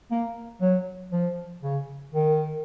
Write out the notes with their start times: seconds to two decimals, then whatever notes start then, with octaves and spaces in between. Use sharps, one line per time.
0.11 A#3
0.61 F#3
1.12 F3
1.62 C#3
2.13 D#3